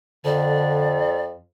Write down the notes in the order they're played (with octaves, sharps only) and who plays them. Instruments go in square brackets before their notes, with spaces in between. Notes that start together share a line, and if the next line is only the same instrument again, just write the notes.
[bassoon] F2 [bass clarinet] D3 [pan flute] D5